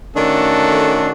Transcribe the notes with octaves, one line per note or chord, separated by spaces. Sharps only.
D#3 A3 C#4 D4 F#4 A4